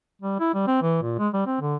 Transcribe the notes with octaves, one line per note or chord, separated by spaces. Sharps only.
G3
E4
G3
C4
E3
A#2
G#3
G3
C4
D3